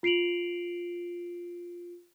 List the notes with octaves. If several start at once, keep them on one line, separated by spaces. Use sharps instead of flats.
F4 C7 D7 F7 F#7